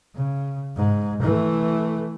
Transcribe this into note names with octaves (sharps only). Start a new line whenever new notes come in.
C#3
G#2
E3 A3